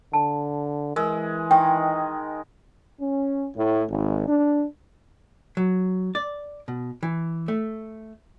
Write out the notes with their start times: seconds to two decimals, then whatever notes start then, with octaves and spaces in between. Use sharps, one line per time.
0.13 D3 A5
0.96 E3 G#3 A#4
1.51 D#3 G5
3.00 C#4
3.56 A2
3.89 G#1
4.27 D4
5.57 F#3
6.15 D5
6.68 B2
7.03 E3
7.48 A3